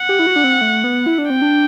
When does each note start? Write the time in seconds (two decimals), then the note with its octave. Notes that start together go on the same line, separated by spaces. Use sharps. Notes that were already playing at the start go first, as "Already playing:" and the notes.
Already playing: F#5
0.09 G4
0.19 E4
0.27 F#4
0.36 D4
0.44 C4
0.61 A3
0.84 B3
1.06 E4
1.18 D4
1.29 C4 G5
1.42 D4